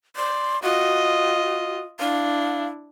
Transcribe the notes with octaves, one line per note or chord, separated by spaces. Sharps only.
D5 C6
F4 F#4 D#5
D4 E4 F5